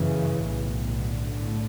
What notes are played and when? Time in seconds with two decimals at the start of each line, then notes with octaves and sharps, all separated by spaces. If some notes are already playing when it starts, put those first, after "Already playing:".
Already playing: F#1 F#2 C#3 E3
0.35 B1 A2
0.86 D3
1.37 A2